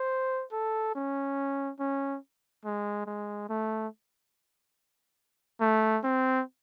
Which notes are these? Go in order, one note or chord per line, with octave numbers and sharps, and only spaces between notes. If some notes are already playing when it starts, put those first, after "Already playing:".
Already playing: C5
A4
C#4
C#4
G#3
G#3
A3
A3
C4